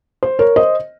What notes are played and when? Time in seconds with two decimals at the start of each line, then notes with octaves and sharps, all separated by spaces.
0.23 C5
0.39 A#4 C#5
0.56 C5 D#5